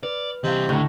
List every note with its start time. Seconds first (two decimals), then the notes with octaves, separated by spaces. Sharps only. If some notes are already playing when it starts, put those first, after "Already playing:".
0.03 B4 D5
0.44 C3 E3 G3 D#5 F5
0.69 C#2 A2 D3 A#5 C#6